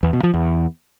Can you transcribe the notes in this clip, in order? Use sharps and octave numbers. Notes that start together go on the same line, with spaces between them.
E2
B2
F3
E2